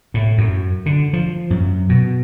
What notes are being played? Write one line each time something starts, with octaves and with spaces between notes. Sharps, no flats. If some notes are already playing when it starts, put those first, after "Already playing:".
A2
F#2
D3
F3
F#2
B2